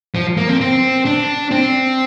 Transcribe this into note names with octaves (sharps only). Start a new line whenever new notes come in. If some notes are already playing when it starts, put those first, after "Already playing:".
F3
A#3
C4
C4
D4
C4